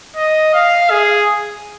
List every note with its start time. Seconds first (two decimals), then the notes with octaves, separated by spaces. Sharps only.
0.16 D#5
0.54 F5
0.91 G#4